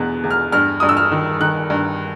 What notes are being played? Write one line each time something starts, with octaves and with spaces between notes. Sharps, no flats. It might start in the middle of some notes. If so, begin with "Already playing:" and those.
Already playing: E2 B2 F#6
E2
F6
G2 F6
G2 D#6
E6
F6
D#3
D#3 F#6
G2